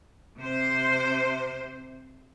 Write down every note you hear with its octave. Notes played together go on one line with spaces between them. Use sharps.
C3 C5